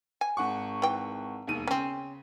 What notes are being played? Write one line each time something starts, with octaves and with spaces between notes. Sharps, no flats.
G#5
G#1 F#5 C#6
E3 G5
E1 D#2 D#7
C#3 C4 C#4